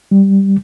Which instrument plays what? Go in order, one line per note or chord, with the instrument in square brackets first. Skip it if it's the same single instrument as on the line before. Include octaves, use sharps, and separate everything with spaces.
[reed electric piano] G3